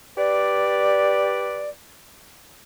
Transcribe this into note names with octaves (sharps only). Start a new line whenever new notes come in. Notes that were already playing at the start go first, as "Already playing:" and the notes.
G4 B4 D5